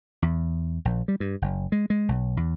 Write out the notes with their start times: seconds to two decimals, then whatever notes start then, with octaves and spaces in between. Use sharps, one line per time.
0.22 E2
0.85 A#1
1.08 G3
1.20 G2
1.42 F#1
1.72 G#3
1.90 G#3
2.09 B1
2.37 E2